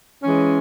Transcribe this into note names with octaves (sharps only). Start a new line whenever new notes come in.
E3 G#3 C#4